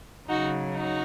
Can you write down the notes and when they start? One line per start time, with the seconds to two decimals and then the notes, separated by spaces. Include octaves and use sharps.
0.29 C#3 F#3 D#4 F#4
0.74 D#4 F#4